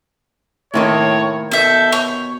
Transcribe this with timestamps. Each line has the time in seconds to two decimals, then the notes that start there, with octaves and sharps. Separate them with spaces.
0.74 A2 C3 D#3 A#3 C#5
1.51 B2 A4 E5 G6
1.92 C#5